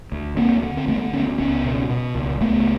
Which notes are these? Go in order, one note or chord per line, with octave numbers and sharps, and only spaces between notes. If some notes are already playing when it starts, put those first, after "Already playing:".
D2
D2 A#3 C4
D3
C4
D3 A3 B3
D2 B3 C#4
C#2 B3 C#4
B2
B2
C#2
C#2 A3 B3